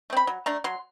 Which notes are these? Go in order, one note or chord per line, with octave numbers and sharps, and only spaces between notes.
A3
C4 B5
F#3
A3 D4 A#5
F#3 C6